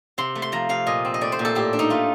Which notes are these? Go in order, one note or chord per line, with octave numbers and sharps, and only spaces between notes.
C3 C6
A3
C6
F3 A#5
C3 F5
A#2 D#5
C4
D#5
A3 D5
C5
A#2
A4
A2 G4
D4
D#4
A3 F4